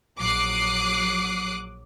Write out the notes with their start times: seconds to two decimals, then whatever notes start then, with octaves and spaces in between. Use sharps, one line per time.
0.19 A#1 F#3 D6 D#6 F#6 C7